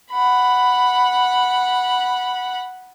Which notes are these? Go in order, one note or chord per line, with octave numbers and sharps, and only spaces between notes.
F#5 B5